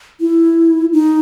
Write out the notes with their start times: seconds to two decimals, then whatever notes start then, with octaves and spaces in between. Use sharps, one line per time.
0.21 E4
0.93 D#4